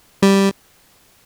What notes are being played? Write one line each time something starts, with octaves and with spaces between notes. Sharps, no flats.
G3